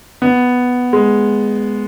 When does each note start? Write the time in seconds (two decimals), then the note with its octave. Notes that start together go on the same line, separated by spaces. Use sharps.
0.22 B3
0.93 G#3